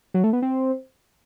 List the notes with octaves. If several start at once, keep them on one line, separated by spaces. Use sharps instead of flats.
F#3
A3
B3
C4